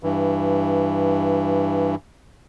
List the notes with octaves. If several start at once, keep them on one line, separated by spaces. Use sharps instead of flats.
G2 E3